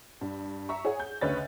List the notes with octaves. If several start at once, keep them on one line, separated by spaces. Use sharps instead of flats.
G2
E5 A#5 C#6
G#4 C#5 F#5
G6
D2 C#3 B4 C#5 D#5 A6